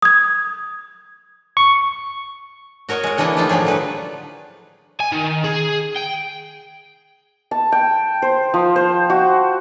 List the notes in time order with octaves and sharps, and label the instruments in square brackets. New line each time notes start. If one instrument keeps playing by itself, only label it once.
[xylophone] D#6 G#6
[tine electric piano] C#6
[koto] F#4 A#4 C#5 D#5
G#3 C#5
D3 E3 A3 A#3 D4 E4
F3 A3 D4 D#4 F4 G4
A2 D3 F3 F#3 G#4
G3 A3 B4
[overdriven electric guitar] G#5
D#3
G#4
G5
[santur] A5
G5
C5
F3
C5
F#4